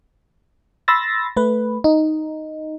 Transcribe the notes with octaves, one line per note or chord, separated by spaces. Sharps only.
B5 C6 E6 A6 A#6
A3 B4
D#4